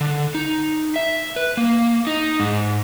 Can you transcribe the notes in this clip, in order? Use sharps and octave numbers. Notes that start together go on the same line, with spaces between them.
D3
D#4
E5
B4
A#3
D#4
G#2